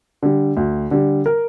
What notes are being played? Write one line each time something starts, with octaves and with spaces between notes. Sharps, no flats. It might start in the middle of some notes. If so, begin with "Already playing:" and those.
D3 G3
D2
D3 G3
A#4